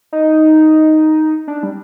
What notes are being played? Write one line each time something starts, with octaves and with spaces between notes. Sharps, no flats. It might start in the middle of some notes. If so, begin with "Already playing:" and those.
D#4
D4
G3